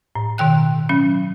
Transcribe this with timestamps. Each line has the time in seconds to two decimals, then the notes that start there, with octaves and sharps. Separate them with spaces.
0.15 A2
0.38 B2 D#3 G5 F#6
0.89 F#3 C#4